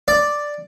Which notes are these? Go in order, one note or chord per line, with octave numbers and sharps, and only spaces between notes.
D5